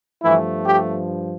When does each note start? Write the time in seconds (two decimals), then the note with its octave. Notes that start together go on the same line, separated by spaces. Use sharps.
0.23 G2 E3 F3 A3 E4
0.65 G4